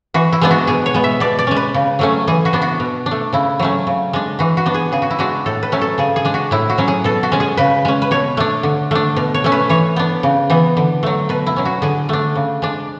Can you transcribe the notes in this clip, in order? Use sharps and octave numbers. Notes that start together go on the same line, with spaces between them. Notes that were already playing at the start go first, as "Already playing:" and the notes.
E3 F#4
E4
G#3 B3 D4
F#4
B2 G#4
C#5
G#3 B3
E5
B2 D5
D5
G#3 C#4
B4
C#3
F#3 A3 C#4
E3 G#4
F#4
B3 D4
F#4
B2
D4
A3
C#3 E4
F#3 A3 C#4
C#3
G#3 D4
E3 F#4
F#4
B3 D4
G#4
C#3 G#4
F#4
E4
G#3 D4 F#4
A2 A4
B4
F#3 A3 C#4
A4
C#3 G#4
G#4
G#3 D4
F#4
A2 E4
F#4
F#3 C#4
G#4
B2 A4
F#4
G#3 C#4
G#4
C#3 B4
G#3 C#4
B4
B2 C#5
A3 D4
D3
A3 D4
B2
C#5
A3 C#4
B4
E3 C#5
B3 D4
C#3
E3 B3
D3
F#3 A3
B2 B4
E4
F#3 C#4
F#4
D3 G#4
A3 D4
C#3
G#3 D4